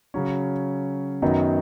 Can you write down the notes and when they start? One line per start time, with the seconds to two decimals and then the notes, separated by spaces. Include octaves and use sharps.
0.14 C#3 F#3 C#4
1.22 F#2 D#3 F#3 B3 D#4